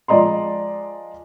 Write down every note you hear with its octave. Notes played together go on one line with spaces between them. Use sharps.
F3 G#3 D5 D#5 A#5 C6